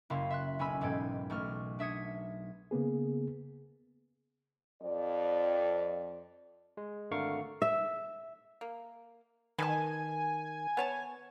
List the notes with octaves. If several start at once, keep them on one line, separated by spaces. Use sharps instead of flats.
F#1 E4 F5 C6
E5 C6 F#6
B1 C#4 G#5 B5 E6 B6
E1 G#2 G#3 A4 G5 G#6
B1 A3 C#6 F6
D4 E5 D#6 G#6 C#7
C#3 A#3 B3 G#4
F2 D5
G#3
G#1 D3 A3 A#4 F5 C#6
E5
A#3
D#3 B4 D#5 G#5 A5
B3 C#5 A5